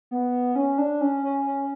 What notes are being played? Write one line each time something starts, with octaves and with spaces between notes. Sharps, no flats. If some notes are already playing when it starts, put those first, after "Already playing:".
B3
C#4
D4
C#4
C#4
C#4